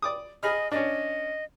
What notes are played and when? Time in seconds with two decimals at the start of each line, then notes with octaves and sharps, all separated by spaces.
0.02 D5 D6 D#6
0.43 G#4 D#5 B5 F6
0.72 C#4 D4 D#5